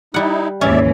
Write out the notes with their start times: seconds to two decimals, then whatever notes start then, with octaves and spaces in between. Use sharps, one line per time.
0.14 G3 D#4 E4 F#5
0.61 D#2 G#2 E3 C#4 D5 E5